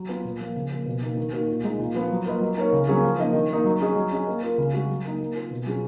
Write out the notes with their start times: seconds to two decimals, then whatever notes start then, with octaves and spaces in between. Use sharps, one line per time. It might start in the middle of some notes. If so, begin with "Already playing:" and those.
Already playing: F#3
0.09 B3 F4
0.25 A#2
0.40 F3 A#3
0.56 C#3
0.71 F3 A#3
0.86 B2
1.02 A#3 D#4
1.17 D#3
1.32 A#3 D#4 F#4 A#4
1.48 A#2
1.64 G#3 D#4
1.79 A#2
1.94 F3 B3
2.11 F#3
2.26 A#3 F4 B4 D#5
2.41 F#3
2.56 A#3 D#4 A#4 C#5
2.73 C#3
2.87 F#3 A#3 C#4 G#4
3.03 F3
3.19 A#3 D#4 A#4 D#5
3.33 D#3
3.50 A#3 D#4
3.64 F#3
3.80 C#4 G#4 D#5
3.96 F#3
4.11 C#4 G#4 D#5
4.28 A#3
4.42 F4 A#4
4.58 C#3
4.73 G#3 C#4 F#4
4.88 F#3
5.05 A#3 D#4
5.20 A#3
5.35 F4 A#4
5.51 B2
5.66 F#3 C#4 F4 G#4